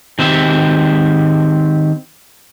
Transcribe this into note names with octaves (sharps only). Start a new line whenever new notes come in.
D#3 C4 G4 E5